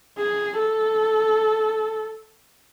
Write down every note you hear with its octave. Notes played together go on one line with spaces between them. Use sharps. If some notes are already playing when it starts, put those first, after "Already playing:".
G#4
A4